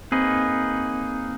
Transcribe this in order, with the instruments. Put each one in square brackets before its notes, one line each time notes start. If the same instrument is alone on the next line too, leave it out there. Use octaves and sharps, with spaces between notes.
[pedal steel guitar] A#3 D#4 G#4 B4 [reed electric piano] C4